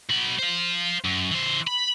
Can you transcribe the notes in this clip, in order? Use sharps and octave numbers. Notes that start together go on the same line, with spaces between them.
F#3 B5
C5 F5
F#2
E3 C5
B5